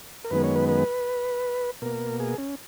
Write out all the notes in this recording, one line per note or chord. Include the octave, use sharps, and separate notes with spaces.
A#4
F#2 D#3 G#3 B3 B4
C#5
B4
B4
B2 A#3 A#4
G#4
C#4